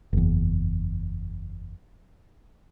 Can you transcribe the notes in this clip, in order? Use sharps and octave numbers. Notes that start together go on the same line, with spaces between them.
F#1 E2